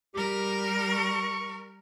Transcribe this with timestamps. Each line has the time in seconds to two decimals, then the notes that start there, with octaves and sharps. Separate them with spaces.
0.14 G3 G4 A#4
0.92 C#6